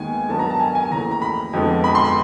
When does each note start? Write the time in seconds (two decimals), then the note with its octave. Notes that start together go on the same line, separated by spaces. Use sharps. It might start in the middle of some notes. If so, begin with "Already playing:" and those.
Already playing: D#2 D#3 G#3 B3 G#5
0.29 G2 D#3 F#3 B3 A5
0.39 A#5
0.50 A5
0.60 G#5
0.75 G#5
0.91 D#2 C#3 E3 A3 A#5
1.11 A#5
1.22 B5
1.53 F2 D3 F3 G#3 B3
1.84 B5
1.95 C6
2.05 B5